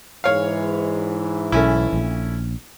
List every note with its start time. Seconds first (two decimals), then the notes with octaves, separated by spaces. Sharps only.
0.24 G#2 E3 C#5 F5
1.52 B1 A3 C#4 E4
1.93 A#1